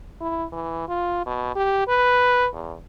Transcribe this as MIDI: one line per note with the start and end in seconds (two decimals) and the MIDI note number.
0.21 0.45 64
0.52 0.87 52
0.88 1.22 65
1.26 1.53 47
1.55 1.88 67
1.88 2.49 71
2.53 2.75 40